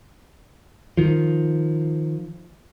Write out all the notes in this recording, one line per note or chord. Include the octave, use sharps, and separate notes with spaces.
D#3 F3